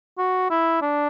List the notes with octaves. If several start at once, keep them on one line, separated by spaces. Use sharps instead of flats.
F#4
E4
D4